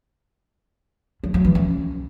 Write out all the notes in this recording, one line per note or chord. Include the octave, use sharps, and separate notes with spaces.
F#3
F#3
E3
C#4